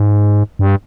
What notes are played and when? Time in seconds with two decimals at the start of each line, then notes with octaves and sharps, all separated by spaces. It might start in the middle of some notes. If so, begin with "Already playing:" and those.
Already playing: G#2
0.59 G2